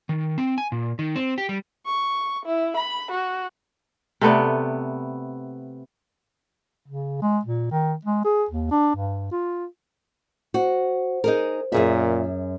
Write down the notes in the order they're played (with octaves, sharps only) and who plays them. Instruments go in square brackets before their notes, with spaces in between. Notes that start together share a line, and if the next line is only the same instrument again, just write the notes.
[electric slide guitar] D#3
C4
G#5
A#2
D#3
C4
G4
G3
[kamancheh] C#6
E4
B5
F#4
[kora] C3 A3 B3 D5
[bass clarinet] C#3
G#3
A#2
D#3
G#3
G#4
D#2
D4
G2
F4
[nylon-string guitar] F#4 [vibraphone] C5
[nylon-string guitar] D#4 G#4 A#4
[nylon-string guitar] F#2 G#4 E5 [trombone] A#2